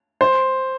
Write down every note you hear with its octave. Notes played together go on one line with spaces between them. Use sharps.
C5